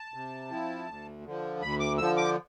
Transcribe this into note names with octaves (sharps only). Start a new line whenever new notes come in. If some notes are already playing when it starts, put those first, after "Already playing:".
Already playing: A5
C3
F3 C4 E4
D2
D3 F3
D2 B5
D6
D3 F3 E6
D6